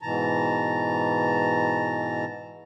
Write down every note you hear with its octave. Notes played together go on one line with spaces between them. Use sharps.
G#2 B2 E3 A5 A#5